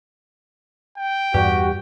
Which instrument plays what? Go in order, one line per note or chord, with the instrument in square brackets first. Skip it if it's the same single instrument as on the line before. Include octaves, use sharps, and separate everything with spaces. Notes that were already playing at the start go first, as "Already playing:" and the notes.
[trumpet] G5
[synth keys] E2 G2 G4 [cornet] F#4